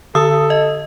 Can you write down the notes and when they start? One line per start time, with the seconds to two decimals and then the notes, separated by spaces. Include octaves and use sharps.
0.15 D3 A4 D#6 E6
0.50 D#5